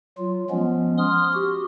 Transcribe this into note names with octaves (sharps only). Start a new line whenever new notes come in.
F#3 F4
F3 G#3 B3 C#4
C6 D#6 F6
F#4 G4